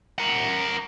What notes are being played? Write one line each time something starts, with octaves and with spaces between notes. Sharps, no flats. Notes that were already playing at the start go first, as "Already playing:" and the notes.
A#4 F#5